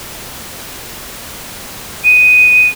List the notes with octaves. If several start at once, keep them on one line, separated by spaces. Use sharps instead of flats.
D#7